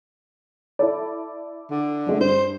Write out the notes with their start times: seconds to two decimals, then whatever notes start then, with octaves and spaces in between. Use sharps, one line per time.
0.79 E4 A4 D5
1.70 D3
2.07 F2 G#3 A3
2.20 G2 C5